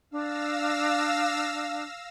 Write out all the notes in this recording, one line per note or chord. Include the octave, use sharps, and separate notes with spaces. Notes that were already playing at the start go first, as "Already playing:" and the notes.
D4 F5 E6 A#6